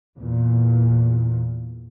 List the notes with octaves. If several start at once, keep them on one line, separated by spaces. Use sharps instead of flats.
E2 A#2